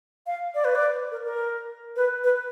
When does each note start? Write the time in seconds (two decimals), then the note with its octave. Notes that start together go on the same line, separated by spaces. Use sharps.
0.27 F5
0.55 D5
0.65 B4
0.75 D5
1.11 A#4
1.25 A#4
1.96 B4
2.24 B4